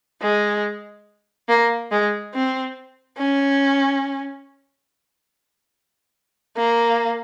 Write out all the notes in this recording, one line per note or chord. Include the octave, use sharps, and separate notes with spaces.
G#3
A#3
G#3
C4
C#4
A#3